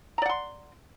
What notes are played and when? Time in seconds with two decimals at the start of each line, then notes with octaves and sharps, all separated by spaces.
0.18 A#5
0.22 D5
0.26 F#5
0.29 C6